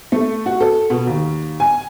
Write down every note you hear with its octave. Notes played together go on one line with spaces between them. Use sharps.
A3
F#4
A4
B2
D#2
G#5